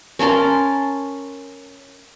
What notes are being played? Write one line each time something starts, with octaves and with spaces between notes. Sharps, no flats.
C#4 A#4 A5 C6